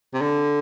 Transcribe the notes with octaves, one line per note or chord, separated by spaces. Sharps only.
C3
D3